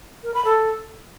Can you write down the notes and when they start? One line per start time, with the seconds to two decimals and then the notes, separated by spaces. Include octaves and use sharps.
0.24 A#4
0.34 B5
0.45 A4